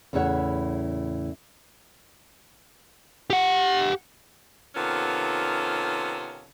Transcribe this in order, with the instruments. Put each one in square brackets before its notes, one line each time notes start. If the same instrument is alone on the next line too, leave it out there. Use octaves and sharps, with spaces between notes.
[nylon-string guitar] E2 A2 C#3 E4 C#5 F#5
[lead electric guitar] G4 F#5
[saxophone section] C3 D#3 B3 C#4 F4 A4